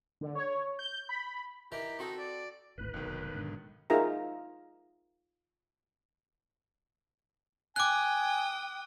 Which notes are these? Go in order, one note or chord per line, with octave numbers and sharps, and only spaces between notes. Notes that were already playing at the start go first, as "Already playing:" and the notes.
D3
C#5
G6
B5
E3 D#4 G4 A#4
C4 D#4 F#4 A4
D5
D1 G#1 A2 B4
F1 B1 D#3 F#3
G#2 D3
D#4 F4 G#4 A#4 E5 A#5
G5 G#5 D6 D#6 F#6